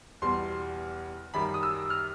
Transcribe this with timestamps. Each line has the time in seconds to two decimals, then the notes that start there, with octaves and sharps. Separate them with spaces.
0.22 E2 B2 G3 C6
1.34 F#2 D#3 G3 B5
1.54 D#6
1.63 E6
1.90 F6